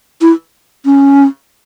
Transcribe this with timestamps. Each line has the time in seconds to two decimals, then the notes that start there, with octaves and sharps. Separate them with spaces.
0.21 E4
0.85 C#4